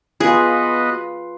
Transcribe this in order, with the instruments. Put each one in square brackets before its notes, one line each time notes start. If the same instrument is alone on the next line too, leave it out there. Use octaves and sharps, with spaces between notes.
[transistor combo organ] B3 F#4 D#5 [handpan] F4 B4 [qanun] G#4